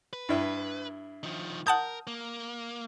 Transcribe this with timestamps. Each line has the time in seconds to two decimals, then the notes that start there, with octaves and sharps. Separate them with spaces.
0.13 B4
0.29 G2 E4
1.23 D#3 F3
1.67 A#4 F#5 A5 D#6 G6
2.07 A#3